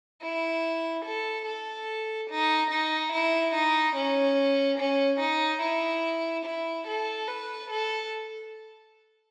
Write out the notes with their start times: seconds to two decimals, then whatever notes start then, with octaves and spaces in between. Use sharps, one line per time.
0.22 E4
1.05 A4
1.46 A4
2.30 D#4
2.71 D#4
3.13 E4
3.55 D#4
3.96 C#4
4.78 C#4
5.20 D#4
5.62 E4
6.46 E4
6.87 A4
7.28 B4
7.70 A4